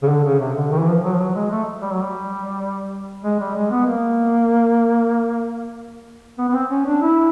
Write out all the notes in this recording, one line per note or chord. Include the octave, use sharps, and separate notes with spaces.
C#3
D3
C#3
C3
D3
D#3
E3
F3
F#3
F3
F#3
G#3
A3
G3
F#3
G3
G#3
G3
G#3
B3
A#3
B3
B3
C4
C#4
D4
E4